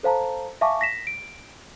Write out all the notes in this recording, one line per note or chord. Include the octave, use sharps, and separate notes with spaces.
A4 C5 F5 A5 A#5
E5 F5 G#5 A5 C#6 D6
A#6 B6 E7
D7